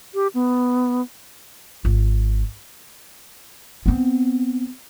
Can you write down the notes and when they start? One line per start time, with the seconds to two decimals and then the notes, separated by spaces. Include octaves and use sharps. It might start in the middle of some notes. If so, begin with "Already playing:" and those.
0.14 G4
0.34 B3
1.85 G#1 F4
3.86 B3 C4